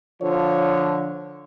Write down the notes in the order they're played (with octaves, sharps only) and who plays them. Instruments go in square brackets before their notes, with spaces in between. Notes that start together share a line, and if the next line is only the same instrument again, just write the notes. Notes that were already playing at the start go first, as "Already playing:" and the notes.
[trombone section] D3 F3 [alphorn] C#5